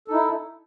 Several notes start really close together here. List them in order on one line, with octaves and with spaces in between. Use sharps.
A4 D#4 E4